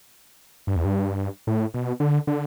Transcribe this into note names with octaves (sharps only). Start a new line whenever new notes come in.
G2
E2
G2
A2
B2
D3
D3